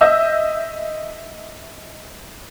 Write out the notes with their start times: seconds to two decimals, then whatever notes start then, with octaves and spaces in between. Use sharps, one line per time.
0.01 D#5 E5 E6 G6